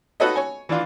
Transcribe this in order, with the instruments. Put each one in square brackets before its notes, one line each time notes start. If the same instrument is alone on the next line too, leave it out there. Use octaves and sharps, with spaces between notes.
[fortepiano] D#4 F#4 A4 B4 C#5 D#5
C#5 G#5
E3 D4 F4